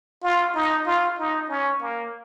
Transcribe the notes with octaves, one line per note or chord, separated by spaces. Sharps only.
F4
D#4
F4
D#4
C#4
A#3